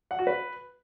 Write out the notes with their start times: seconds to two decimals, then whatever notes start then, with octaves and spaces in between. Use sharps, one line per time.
0.11 F#5
0.19 F#4
0.27 B4